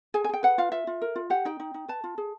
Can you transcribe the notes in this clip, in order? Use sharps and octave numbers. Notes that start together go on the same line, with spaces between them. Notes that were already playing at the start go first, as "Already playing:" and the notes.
G#4 G#5
G#5
G#4 G5
B4 F#5
F4 F5
F4 E5
F4
A#4
F4
G4 F#5
D#4 G5
D#4
D#4
B4 A5
F4
G#4